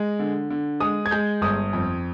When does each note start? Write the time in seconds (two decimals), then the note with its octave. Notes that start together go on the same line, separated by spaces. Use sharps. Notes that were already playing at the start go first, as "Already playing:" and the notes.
Already playing: G#3
0.19 D3
0.50 D3
0.80 G#3 D#6
1.06 G#6
1.11 G#3 G6
1.42 G1 D#6
1.73 F2